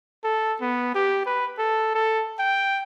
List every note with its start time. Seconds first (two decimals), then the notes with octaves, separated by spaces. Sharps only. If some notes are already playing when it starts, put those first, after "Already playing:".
0.24 A4
0.61 B3
0.95 G4
1.26 B4
1.58 A4
1.95 A4
2.39 G5